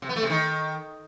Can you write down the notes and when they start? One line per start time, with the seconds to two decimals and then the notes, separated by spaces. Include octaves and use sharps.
0.02 C3
0.09 B3
0.16 A3
0.23 C3
0.30 D#3